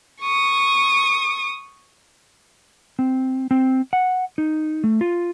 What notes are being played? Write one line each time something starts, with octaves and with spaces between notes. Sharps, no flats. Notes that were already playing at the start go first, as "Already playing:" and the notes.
C#6 D#6
C4
C4
F#5
D#4
A3
F4